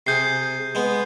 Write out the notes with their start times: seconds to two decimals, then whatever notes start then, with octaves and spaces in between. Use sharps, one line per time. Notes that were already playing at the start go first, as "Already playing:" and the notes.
0.07 C3 G#4 G6 C7
0.75 G#3 B3